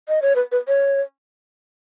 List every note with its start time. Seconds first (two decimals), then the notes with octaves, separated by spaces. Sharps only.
0.09 D#5
0.22 C#5
0.36 B4
0.52 B4
0.68 C#5